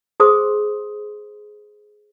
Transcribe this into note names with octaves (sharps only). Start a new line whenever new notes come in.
G#4 C5 C6 D#6